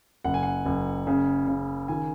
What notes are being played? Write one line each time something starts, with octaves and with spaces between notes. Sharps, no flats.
F#1 F#5
G#5
F#5
F#1
C#3
C#3
D#3 G#5